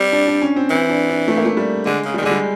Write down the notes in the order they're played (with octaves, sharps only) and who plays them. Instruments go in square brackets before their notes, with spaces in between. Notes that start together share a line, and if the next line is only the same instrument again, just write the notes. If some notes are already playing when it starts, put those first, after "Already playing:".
Already playing: [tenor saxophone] G3 [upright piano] C4
[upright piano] D4
D4
C#4
C4
[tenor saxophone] E3 [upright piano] C4
[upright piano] D4
D4
A3
A#3
A3
G3
[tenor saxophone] D3 [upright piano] G#3
[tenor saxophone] C#3
[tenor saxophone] D#3 [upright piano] G3
[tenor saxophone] D3 [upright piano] G#3
[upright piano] G3